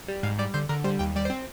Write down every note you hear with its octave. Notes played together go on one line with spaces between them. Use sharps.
G3
G#2 F5
G3 D5
D3 C5
D3 A#4
G3 C5
D#2 G5
G3 D5
C5
C4